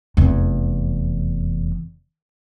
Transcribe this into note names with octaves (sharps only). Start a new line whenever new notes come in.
F1 E2